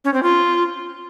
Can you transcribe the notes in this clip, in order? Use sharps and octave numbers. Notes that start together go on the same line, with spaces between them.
C#4
C4
F4